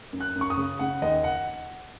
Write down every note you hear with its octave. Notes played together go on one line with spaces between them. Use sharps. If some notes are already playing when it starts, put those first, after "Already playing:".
F#2
F#6
F#2
C#6
D#6
C#3
C#3 F#5
D#2 D#5
F#5